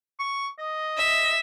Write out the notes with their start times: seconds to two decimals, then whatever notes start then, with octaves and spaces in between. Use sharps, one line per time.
0.19 C#6
0.58 D#5
0.97 E5